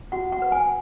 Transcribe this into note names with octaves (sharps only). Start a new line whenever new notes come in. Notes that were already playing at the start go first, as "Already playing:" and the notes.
F#4 F#5
F#5
B4
G#5